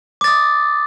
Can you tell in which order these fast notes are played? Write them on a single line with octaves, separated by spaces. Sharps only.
D6 A6 D#6